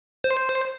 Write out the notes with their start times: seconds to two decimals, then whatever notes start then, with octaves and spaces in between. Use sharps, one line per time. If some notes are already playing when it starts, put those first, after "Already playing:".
0.24 C5